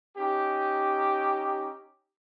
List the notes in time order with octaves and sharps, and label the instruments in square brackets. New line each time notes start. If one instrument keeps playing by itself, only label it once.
[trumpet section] C#4 D#4 G4